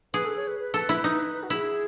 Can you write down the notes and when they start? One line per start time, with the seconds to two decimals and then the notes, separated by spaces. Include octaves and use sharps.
0.14 G#4 B4
0.25 A4
0.36 C#5
0.47 B4
0.59 B4
0.74 A4
0.89 E4
1.04 D#4
1.43 F#4
1.50 E4 G#4